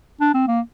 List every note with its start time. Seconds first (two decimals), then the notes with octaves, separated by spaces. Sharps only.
0.21 D4
0.34 C4
0.48 A#3